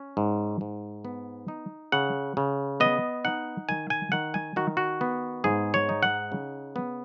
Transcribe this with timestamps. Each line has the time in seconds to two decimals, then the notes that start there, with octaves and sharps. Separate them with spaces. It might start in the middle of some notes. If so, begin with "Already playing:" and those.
Already playing: C#4
0.17 G#2
0.61 G#2
1.05 B3
1.48 D#4
1.92 C#3 F#5
2.37 C#3
2.80 B3 D#5
3.25 D#4 F#5
3.69 D#3 G#5
3.90 G#5
4.12 D#3 F#5
4.34 G#5
4.56 D#3 F#4
4.77 F#4
5.01 B3
5.44 G#2 G#4
5.74 C#5
5.89 D#4
6.03 F#5
6.32 C#3
6.76 B3